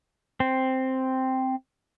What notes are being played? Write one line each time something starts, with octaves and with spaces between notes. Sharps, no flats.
C4